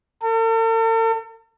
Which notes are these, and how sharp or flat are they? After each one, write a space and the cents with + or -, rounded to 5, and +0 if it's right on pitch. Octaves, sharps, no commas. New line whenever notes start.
A4 +45